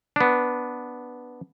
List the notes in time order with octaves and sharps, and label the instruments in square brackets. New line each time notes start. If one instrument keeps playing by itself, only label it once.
[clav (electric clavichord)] B3 D4